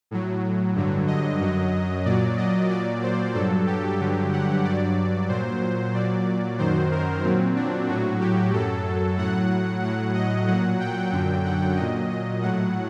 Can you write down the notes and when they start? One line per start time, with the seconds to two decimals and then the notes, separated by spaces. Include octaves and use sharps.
0.11 A2 F#3
0.75 G2 D3 F#3
1.07 D#5
1.40 F#2 F#3
2.05 A#2 F#3 D5
2.37 D#5
2.70 A#2 F#3 D5
3.03 C5
3.35 G2 F#3 A4
3.67 G4
3.99 G2 D3 F#3
4.32 F#5
4.64 G2 F#3 D5
5.29 A#2 F#3 C5
5.94 A#2 F#3 D5
6.58 F#2 D#3 F#3 C5
6.91 A#4
7.24 A#2 F#3 C4
7.56 D4
7.88 A2 F#3 F#4
8.20 G4
8.52 F#2 F#3 A4
9.17 A2 F#3 F#5
9.82 A2 F#3 F#5
10.14 D#5
10.47 A#2 F#3 F#5
10.80 G5
11.12 F#2 D3 F#3
11.45 F#5
11.77 A#2 F#3 D#5
12.10 D#5
12.42 A2 F#3 F#5